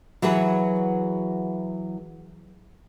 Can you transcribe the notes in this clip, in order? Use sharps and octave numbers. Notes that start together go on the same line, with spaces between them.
E3 F#3 F#4 G#4 B4